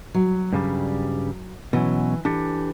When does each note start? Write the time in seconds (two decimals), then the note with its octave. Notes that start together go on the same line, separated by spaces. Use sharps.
0.14 F#3
0.53 G2 C#3 G3
1.73 B2 E3 F#3 C#4
2.25 E3 D4 G4 A4